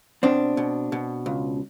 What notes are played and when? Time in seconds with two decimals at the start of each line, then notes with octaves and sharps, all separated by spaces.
0.23 B2 C4 D4
0.57 B2
0.92 B2
1.26 C#2